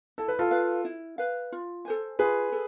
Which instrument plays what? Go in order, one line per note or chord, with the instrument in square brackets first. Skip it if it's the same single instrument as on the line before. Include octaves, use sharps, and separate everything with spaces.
[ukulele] E4 [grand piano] A4
[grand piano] B4
F4 A4
[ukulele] B4 F5
E4
B4 F5
F4
A4 C5 G#5
[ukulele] F4 [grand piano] G#4 B4
[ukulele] A4